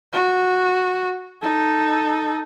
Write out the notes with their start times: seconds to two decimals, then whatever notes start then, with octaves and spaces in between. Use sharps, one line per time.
0.13 F#4
1.42 D#4 A4